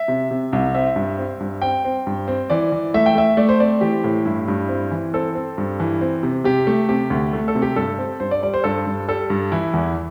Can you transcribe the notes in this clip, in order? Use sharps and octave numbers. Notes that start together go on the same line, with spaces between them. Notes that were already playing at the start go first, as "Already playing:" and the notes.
Already playing: E5
C3
C3
C2
C4 E5
G2
C4
G2
C4 G5
C4
G2
C4
E3 D5
E3
A3 E5
G5
A3 E5
A3 D5
C5
C4 D5
E3 G4
A2
G2 E4
G2
C4
E3
C4 A4
C4
G2
E3
C4
C3
C3 G4
A3
C3 G4
D2
A3
A4
C3
G4
G2 A4
C4
G2 C5
D5
G3 D5
C5
G2 A4
G2
G3 A4
G2
E3 E4
E2